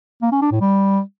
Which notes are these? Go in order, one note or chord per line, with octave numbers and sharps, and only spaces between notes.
A#3
C#4
D4
A2
G3